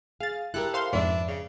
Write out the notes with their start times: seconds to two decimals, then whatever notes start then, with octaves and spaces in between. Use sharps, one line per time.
0.20 G#4 F5 A6
0.54 E4 G4 A4 A#4 F#6
0.74 C5 F5 C6
0.93 F2 G#2 D4 B4 E5
1.28 C#3